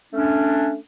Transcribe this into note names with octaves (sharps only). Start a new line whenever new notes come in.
A3 C#4 D4